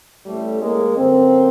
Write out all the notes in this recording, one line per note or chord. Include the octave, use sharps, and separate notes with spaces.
A1 A2 E3 G3 A3
G#3 A#3
G1 F#2 D3 A#3 C4